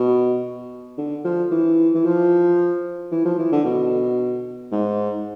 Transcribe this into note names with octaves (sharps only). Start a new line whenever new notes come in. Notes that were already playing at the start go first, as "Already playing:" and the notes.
Already playing: B2
D3
F3
E3
E3
F3
E3
F3
E3
D3
B2
G#2